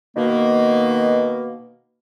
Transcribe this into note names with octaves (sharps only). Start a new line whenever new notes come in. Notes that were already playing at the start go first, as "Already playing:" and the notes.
B2 D#3 A#3